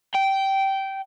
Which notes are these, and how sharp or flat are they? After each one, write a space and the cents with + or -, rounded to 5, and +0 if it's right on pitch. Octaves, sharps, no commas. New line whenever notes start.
G5 -15